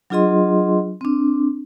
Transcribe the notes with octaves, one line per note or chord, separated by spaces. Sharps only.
F#3 D4 F4 G#4 D#5 C6
C4 D4